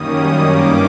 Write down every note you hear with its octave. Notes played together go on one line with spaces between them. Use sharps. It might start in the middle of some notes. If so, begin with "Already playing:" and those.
Already playing: F#2 D#3 G3 A#3 C#4 D#6
G2 D#3 G3 A#3 C#4 D6